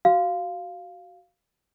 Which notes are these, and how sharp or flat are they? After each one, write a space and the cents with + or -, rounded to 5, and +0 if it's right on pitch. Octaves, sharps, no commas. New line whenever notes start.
F#4 +15 F5 +0